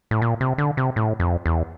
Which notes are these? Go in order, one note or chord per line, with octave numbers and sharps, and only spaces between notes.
A2
A#2
C3
D3
C3
A2
F2
E2